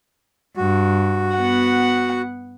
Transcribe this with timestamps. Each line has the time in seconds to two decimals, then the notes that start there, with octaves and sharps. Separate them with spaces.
0.57 G2 F#4
1.35 B3 F#5